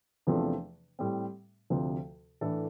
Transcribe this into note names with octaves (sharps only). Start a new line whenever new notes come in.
E2 C3 F3 A3 D4
A2 G3 C4
D2 C3 F3
A2 E3 A3 D4 A4